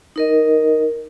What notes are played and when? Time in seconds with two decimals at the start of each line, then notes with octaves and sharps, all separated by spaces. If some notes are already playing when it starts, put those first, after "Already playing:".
0.16 D#4 A#4 D#5